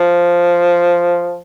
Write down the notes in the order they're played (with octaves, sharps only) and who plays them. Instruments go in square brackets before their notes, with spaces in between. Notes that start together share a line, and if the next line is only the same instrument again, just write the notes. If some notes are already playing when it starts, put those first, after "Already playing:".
Already playing: [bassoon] F3